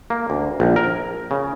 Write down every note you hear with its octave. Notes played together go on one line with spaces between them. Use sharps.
A#3
D2
A#1
A#4
C#3